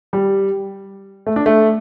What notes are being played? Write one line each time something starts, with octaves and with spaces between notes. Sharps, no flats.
G3
A3
D4
A3